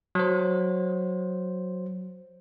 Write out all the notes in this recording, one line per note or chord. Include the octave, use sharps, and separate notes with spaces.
F#3 C5